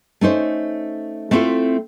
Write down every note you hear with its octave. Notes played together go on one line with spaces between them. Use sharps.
A3 C#4 D#4 C5
A3 C4 D4 E4 F4 A4